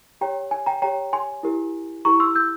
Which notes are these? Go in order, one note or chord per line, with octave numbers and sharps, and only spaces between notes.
G4 C#5 G5 A#5
G#5
G5 A#5
G4 C#5 G5 A#5
G#5 C6
E4 G4 A#4
E4 G4 A#4 A#5 C#6
C6 E6
E6 G6